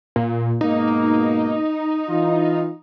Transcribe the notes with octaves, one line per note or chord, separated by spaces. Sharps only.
A#2
G#2 B2 A#3 D#4
E3 F4